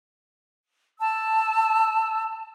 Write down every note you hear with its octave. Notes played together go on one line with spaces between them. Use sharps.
A5 E6